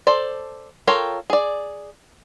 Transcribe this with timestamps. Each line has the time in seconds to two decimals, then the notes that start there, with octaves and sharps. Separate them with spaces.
0.07 A4 C5 D5
0.87 F4 A4 A#4 C#5 G5
1.30 G#4 D5